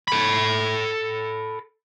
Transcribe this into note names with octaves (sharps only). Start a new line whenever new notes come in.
A4 B5